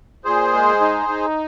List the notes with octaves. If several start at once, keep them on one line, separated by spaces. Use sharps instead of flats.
A#2 G#4 C5
G#3
D#4
D#4